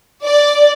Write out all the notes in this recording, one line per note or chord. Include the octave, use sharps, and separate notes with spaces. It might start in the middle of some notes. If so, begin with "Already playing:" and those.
D5